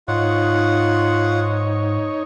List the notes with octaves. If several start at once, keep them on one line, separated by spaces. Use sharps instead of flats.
G#2 D#4 F4 C#5 F#5